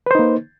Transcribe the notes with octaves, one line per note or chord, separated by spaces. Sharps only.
A#3 D#4 B4 C5